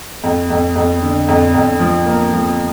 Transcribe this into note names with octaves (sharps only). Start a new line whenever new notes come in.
F2
F2
F2
D3
F2
F2
F3
A#3
F3